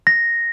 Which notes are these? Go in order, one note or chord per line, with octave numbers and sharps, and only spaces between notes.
A#6